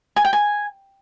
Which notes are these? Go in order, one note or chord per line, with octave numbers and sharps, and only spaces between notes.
G#5
G5
G#5